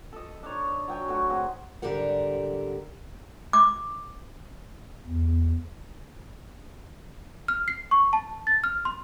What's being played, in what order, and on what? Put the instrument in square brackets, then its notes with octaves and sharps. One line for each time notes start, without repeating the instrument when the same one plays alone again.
[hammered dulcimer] A4 D#5
D4 D#4 C#5
F#3 G5 G#5
A3 D#4 F#4
C4 F#4 G#4
[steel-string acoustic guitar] G#2 D3 G3 G4 A#4 F#5
[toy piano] D6
[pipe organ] E2
[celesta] F6
C7
C#6
A5
A6
F6
C6